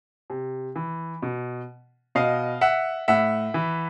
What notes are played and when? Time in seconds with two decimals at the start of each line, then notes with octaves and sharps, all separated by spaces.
0.30 C3
0.76 E3
1.22 B2
2.15 B2 D#5 F5
2.61 E5 F#5
3.08 A2 E5 F#5
3.54 E3